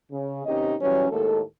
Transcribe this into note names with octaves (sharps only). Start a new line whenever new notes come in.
C#3
D#2 C3 C#4 D#4 G4 D#5
E3 F#3 G3 C#4
D#2 A2 G#3 A#3 A4